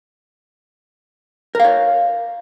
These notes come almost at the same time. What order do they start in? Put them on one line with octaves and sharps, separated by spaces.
A#4 F5 C#5